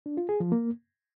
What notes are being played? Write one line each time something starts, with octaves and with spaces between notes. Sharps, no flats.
D4
F4
G#4
F3
A#3